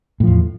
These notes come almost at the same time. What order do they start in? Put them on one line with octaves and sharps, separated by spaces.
A2 F3 E2